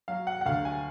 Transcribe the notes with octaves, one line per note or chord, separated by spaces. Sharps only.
F#3 F5
F#5
F#5
D2 F5
G#5